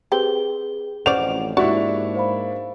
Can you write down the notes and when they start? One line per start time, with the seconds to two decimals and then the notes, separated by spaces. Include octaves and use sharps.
0.12 C4 G4 G#4 B4 G7
1.06 A1 F2 C#4 C5 D5 F#5 D7 F7
1.57 G#2 A#3 D4 E4 F#4 G4 C#6
2.15 C5 F5 B5